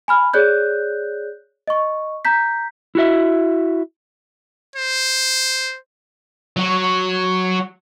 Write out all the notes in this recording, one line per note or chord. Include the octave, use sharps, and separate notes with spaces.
G#5 B5 F6
G#4 C#5 D5 F#6 G6
D#5 C#6
A#5 G6 B6
E4 F#4 E5
C5
F#3 F#4